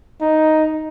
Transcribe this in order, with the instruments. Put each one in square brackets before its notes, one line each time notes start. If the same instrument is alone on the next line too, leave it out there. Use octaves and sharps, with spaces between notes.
[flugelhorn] D#4